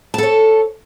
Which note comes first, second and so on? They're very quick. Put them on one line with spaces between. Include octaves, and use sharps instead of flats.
A5 A4 C#5